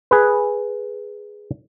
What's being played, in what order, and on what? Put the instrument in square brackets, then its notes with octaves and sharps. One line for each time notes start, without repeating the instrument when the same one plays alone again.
[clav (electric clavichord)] G#4 B4